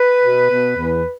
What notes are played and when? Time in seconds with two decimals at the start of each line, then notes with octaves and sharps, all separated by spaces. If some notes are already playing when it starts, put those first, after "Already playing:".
Already playing: B4
0.22 B2
0.50 B2
0.77 E2